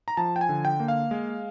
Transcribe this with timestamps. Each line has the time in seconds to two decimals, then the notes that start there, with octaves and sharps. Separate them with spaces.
0.08 A#5
0.17 F3 A5
0.36 G5
0.41 G#5
0.49 D3
0.65 G5
0.80 A#3
0.88 F5
1.11 G#3